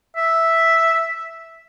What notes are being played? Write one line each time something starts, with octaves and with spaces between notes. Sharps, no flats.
E5